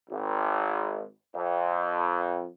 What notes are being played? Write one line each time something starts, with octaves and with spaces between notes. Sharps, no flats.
G#1
F2